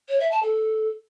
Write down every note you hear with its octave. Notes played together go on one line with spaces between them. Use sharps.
C#5
E5
A5
A4